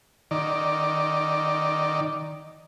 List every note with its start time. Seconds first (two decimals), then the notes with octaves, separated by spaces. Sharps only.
0.31 D#3 D5